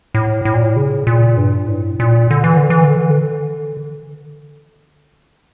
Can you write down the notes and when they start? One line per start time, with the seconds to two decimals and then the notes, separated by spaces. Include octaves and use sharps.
0.14 A2
0.45 A2
0.54 A#2
0.63 A2
0.76 C#3
1.07 A#2
1.37 G2
1.68 A2
2.00 A#2
2.31 D3
2.44 E3
2.57 D3
2.70 E3
2.84 D3
2.97 E3
3.10 D3